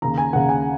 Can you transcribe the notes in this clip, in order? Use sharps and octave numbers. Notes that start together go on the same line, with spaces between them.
D#2 C#3 A#5
G#5
D#2 C#3 F#5
G#5